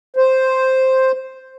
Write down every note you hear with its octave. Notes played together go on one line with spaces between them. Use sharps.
C5